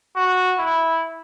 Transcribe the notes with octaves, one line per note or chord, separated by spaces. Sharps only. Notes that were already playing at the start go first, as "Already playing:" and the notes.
F#4
E4